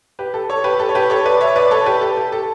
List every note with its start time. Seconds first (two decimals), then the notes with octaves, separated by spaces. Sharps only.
0.19 G4 B4
0.34 A4
0.50 A4 C#5
0.64 G4 B4
0.80 A4
0.89 C#5
0.95 G4 B4
1.10 A4 C#5
1.26 B4 D5
1.41 C#5 E5
1.56 B4 D5
1.71 A4 C#5
1.86 G4 B4
2.01 A4
2.17 G4
2.32 A4